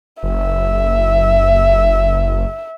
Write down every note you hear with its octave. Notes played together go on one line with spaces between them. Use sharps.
F#1 E5